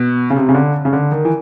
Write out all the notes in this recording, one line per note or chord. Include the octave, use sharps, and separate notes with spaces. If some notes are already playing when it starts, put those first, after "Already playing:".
Already playing: B2
C#3
C3
C#3
D3
C#3
D3
D#3
E3